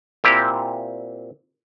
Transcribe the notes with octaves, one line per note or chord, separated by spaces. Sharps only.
A#2 C4 E4 G4